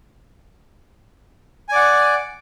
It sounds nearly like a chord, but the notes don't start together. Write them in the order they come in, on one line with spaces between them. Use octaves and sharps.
G#5 D5 F#5